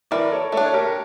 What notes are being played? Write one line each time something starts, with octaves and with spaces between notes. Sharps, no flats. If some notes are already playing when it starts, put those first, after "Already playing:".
E3 A#4 D5
A4 C#5
A3 D4 A4 C#5
C#5
G4 A#4